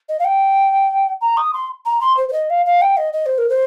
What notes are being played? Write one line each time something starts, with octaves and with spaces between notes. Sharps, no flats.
D#5
F5
G5
A#5
D#6
C6
A#5
C6
C5
C5
D#5
F5
F5
G5
D#5
D#5
C5
A#4
C5